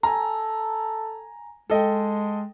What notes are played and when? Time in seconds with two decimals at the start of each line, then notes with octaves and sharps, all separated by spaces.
0.03 A4 G#5 A#5
1.70 G#3 A4 D#5 G5